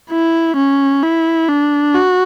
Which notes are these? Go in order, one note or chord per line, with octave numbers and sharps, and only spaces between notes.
E4
C#4
E4
D4
F#4